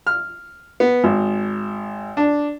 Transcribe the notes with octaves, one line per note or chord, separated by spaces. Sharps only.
F6
B3
G#1
D4